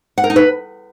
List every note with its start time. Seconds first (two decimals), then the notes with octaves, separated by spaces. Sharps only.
0.18 F#5
0.24 A#4
0.30 D#4
0.36 B4